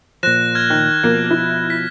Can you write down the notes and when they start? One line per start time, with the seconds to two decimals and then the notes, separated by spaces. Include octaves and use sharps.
0.23 A#2 F3 C5 F#6 A#6 E7
0.55 F6 G#6
0.70 D#3
1.04 B2 F3 A#3
1.31 E4
1.70 B6